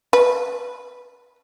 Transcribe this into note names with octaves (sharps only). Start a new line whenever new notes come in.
B4